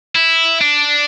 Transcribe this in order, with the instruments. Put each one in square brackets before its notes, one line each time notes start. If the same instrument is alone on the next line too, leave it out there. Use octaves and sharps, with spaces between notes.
[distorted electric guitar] E4
D4